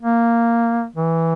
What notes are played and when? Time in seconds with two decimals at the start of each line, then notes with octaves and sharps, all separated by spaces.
0.02 A#3
0.95 E3